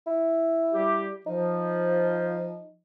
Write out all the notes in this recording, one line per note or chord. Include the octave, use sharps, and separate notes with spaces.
E4
G3 G4
F3 D#4